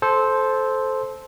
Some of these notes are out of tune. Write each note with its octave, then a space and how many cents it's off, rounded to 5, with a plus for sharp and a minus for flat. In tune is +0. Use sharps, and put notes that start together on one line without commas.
A4 -15 C5 +0